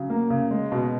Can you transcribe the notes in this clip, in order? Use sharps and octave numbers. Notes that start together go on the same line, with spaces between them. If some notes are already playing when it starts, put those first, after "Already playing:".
Already playing: C#3 F#3
A#3
C#3
G#3
B2